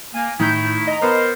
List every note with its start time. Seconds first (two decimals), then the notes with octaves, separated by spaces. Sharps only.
0.14 A#3 G#5
0.40 A2 D#3 A3 D#4 E4 G6
0.87 D#5 A#5
1.02 B3 A#4 C5